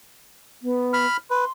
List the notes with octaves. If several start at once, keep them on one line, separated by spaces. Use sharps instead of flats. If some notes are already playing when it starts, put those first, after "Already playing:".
B3
B5 F6
B4 C6